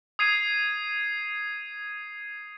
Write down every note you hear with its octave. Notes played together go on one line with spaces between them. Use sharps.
D#6 G#6 C7 D#7